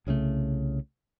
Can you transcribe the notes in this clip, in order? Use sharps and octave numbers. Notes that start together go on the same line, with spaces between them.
C2 C#3 F3 A3